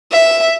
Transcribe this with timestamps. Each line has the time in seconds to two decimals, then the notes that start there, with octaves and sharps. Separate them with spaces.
0.12 E5